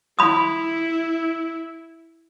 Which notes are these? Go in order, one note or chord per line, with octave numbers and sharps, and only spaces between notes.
E4 B5 D#6